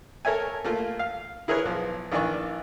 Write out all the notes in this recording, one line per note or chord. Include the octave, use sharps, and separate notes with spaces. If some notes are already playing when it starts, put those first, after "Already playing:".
A4 A#4 C#5 E5 G#5
A3 A#3 F4
F5
E4 G#4 A#4 B4 C#5
B1 F3
A#1 D#3 E3 D5 C#6